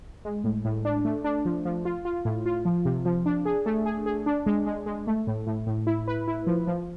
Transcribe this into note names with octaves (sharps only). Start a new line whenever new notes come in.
G#3
A2
A2
D4
A3
D4
F3
F3
F4
F4
A2
F4
F3
C3
F3
D4
G#4
A3
G#4
G#4
D4
G#3
G#3
G#3
A3
A2
A2
A2
E4
B4
E4
F3
F3